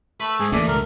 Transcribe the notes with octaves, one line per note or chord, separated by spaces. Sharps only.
A3 B4
G#2 G#4
A1 D2 E3 A3 A#3 D5
C#2 G2 B2 E3 A#4